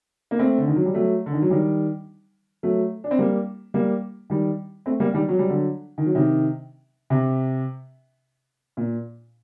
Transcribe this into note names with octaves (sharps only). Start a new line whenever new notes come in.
A#3
A3 C4
D3
D#3
F#3
G3
F#3 A3
D3
D#3
F#3
D#3 G3
F#3 A3
D4
C4
G3 A#3
G3 A#3
D#3 G3
A3 C4
G3 A#3
D#3 G3
F#3
G3
D3 F#3
D#3
F#3
C3 D#3
C3
A#2